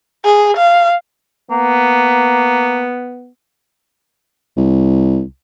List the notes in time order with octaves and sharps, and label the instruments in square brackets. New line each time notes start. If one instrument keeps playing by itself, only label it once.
[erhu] G#4
F5
[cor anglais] A#3 [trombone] B3
[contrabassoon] C2